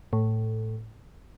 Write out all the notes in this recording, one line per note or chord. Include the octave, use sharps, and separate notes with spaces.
A2